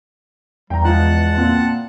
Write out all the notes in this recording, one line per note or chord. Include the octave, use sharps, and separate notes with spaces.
E2 G3 G5 A#5
F3 G#3 F#5 A5 F#6
A#2 C4